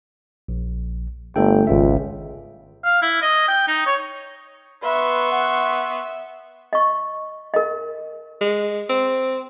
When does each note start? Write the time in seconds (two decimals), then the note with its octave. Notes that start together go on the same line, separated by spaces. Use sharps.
0.48 A#1
1.36 G1 A3 A4 G5
1.67 G#1 C#2 F4 E5
2.84 F5
3.02 E4
3.22 D#5
3.48 G5
3.68 D#4
3.87 C#5
4.84 B3 B4 E5 C6 C#6
5.32 F#5
6.73 D#5 C#6
7.54 A#4 D#5
8.41 G#3
8.89 C4